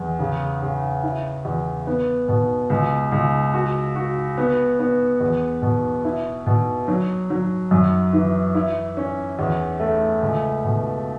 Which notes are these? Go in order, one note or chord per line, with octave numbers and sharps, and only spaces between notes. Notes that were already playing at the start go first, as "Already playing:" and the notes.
Already playing: E2
C#3
C#3
E4
E2
B3
B2
C#2
C#2
F#4
F#4
B3
B3
E2
B2
E4
B2
F#3
F#3
F#2
E3
E4
C#4
E2
A3
C#2
B2